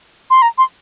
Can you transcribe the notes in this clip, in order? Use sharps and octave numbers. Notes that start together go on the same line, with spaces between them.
C6
A#5
C6